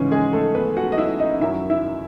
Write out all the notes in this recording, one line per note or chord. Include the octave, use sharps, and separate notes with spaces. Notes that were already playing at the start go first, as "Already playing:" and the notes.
Already playing: G#2 C#3 E3 G#3 C#4
G#3 G#4
A3 A4
B3 B4
F#4 F#5
D#5
E4 E5
D#4 D#5
F#2 D#3 F#3 E4 E5
E4 E5